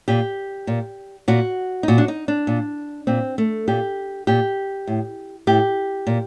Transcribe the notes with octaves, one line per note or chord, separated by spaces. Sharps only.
A#2 G4
A#2
A#2 F#4
D#4
A#2 F#4
D4
D#4
D4
A#2
A#2 C4
A3
A#2 G4
A#2 G4
A2
A2 G4
A#2